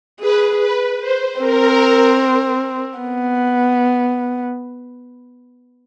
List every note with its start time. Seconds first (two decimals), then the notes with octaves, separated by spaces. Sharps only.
0.20 G#4 B4
0.60 B4
1.00 C5
1.39 C4 A#4
2.99 B3